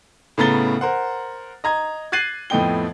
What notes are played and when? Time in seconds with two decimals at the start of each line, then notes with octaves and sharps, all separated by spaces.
0.38 A2 C#3 B3 A#5 A6 G7
0.81 A#4 C5 F#5
1.64 D#5 A#5 G#6
2.12 F#6 G#6 A6 C7 D#7 F#7
2.50 F2 A2 B3 D#5 G5 G7